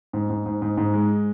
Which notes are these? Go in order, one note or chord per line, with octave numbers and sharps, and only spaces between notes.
G#2
G#2
G#2
G#2
G#2
G#3